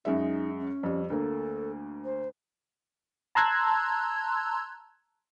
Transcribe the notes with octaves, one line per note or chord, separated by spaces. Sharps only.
F#2 G#3 D#4 E5
C#4
F2 G3
D2 A#3 A4
C5
A5 A#5 C6 E6 F#6 G#6